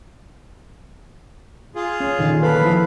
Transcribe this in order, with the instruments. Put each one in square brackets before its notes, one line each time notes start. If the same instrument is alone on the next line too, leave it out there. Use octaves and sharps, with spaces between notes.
[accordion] F4 G#4
[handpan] C#4
A#2 D3 D#3
[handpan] A4 B4 [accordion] F5 B5
[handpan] F3 E4